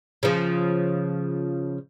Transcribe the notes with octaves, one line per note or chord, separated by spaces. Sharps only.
C#3 F3